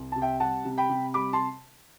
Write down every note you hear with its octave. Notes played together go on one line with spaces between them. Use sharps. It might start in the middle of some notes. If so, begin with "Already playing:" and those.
Already playing: C2
C3 A5
E5 G5
G3 F#5 A5
C3
G5 B5
C3
G3 B5 D6
A5 C6